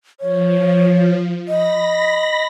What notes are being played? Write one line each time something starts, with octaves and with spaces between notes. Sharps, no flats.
F3 C#5
D#5 B5 A#6